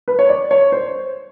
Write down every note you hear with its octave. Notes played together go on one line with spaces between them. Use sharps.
B4
C#5
D5
C#5
C5